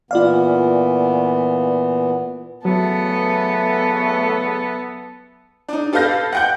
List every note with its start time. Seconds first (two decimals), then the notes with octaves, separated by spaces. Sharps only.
0.11 A#2 E3 B3 F4 D5 F5
2.65 E2 C#3 F#3 A3 B3 A4
5.69 D4 D#4
5.93 G4 A4 B4 F5 G6 A#6
6.33 F#5 G5 G6